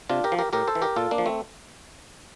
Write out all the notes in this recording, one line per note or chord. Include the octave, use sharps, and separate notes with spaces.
C3 D4 F4
G4 A#4
F3
G4 A#4
A2 G4 A#4
A4 C5
E3
G4 A#4
A#2 F4 A4
A#3 D4
F3
A3 C4